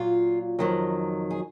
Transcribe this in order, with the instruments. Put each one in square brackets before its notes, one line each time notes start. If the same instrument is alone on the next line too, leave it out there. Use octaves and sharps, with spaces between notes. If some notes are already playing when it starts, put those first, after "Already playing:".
Already playing: [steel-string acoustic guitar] A#2 F#3 F4
F2 D#3 F#3
G#4